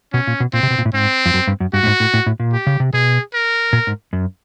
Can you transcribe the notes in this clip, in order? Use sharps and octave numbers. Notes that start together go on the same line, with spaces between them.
B2 C#4
A#2
B2
A#2 C4
C3
B2
A#2
A2
G#2 C4
F2
F#2
G2
F#2
G2 F#4
A2
G#2
A2
A2
A2
A#2
G4
C#3
C3
B2 G#4
A#4
A#2
G#2
F#2